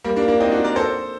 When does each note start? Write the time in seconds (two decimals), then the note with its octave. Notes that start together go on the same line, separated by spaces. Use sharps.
0.04 G3 A#3
0.16 A#3 D4
0.28 A#3 D4
0.40 C4 D#4
0.52 D4 F#4
0.64 A#4 D5
0.76 A4 C5